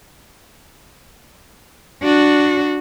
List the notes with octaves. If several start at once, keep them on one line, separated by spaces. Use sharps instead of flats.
D4 F#4